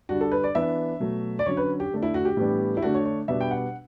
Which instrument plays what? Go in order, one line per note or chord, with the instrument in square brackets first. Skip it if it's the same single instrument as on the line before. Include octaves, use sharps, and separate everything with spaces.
[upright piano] D3 G3 D4 F#4
A4
B4
D5
E3 B3 D4 E5
B2 F#3 A3
D5
D3 F#3 C#4 C#5
B4
G4
D3 A3 D4
E4
F#4
G4
A2 E3 G3 B3 D4
E4
D3 A3 D4 F#4
C#5
C#5
B2 G3 B3 D4 E5
G5
F#5